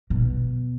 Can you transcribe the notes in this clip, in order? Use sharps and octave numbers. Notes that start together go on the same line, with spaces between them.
B2